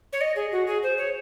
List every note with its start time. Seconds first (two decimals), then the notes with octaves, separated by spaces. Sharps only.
0.13 C#5
0.21 D#5
0.36 G#4
0.52 F#4
0.67 G#4
0.83 C5
0.98 C#5